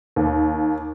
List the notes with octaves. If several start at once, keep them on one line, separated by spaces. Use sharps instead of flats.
D#2